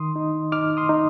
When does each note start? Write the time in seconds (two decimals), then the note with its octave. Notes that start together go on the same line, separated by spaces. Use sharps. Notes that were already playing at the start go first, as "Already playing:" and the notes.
Already playing: D#3 C6 D#6
0.16 D#4
0.52 D#4 D6 F6
0.77 C6 D#6
0.89 D#4